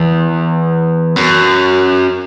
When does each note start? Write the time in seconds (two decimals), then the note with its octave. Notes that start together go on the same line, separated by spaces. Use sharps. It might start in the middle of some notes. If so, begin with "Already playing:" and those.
Already playing: E2
1.16 F#2